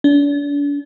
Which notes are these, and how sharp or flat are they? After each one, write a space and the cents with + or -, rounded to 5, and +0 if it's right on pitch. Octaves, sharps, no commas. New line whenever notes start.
D4 -40